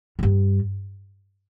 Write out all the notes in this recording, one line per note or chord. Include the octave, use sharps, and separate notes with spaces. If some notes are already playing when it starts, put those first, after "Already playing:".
F2
G2